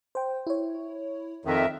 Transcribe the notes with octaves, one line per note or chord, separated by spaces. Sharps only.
C5 G5
E4 C#5
F2 D#3 A#4 E5